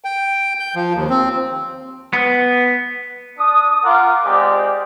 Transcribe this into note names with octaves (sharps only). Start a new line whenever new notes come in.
G5
G6
F3
D#2
C4
B3
D4 D#6
F4 A#4 F5 F#5 D6
G#3 C4 G4 D5